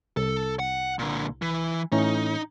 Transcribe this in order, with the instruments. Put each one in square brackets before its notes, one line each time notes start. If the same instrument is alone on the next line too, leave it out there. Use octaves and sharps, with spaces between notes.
[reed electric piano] C2 [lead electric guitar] A4
[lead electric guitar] F#5
A#2 D3
E3
[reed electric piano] A2 E3 C#4 [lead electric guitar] D#4